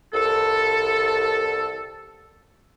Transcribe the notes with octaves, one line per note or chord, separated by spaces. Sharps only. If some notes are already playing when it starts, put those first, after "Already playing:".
C2 A4